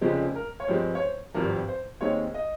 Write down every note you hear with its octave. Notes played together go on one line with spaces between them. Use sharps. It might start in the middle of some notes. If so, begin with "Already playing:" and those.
F1 F2 C#3 F3 G#3 C5
A#4
C#5
G2 F3 G#3 C4 C5
C#5
C5
G#1 G2 F3 C4 A#4
C5
D#2 D#3 G#3 C4 C#5
D#5